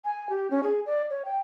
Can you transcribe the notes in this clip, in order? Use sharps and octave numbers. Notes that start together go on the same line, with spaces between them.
G#5
G4
C#4
G#4
D5
C#5
G5